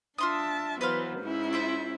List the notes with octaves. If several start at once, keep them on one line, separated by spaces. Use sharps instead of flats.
D4 F4 E5 A5 C6 D#6
E3 F#3 B3 B4 C5 F5
G#2 C#4 E4
F4 C5 E5